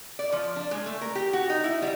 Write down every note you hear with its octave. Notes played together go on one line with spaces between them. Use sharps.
D5
F3
D4
G#3
A3
A#4
G4
F#4
D#4
E4
G3